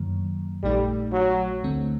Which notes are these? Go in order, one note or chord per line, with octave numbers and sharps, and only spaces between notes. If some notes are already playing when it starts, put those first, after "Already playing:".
Already playing: F#2 D#3 F#3 A#3
A#1 A#2 G3 A3 D#4
F#3
D2 D3 A3 C4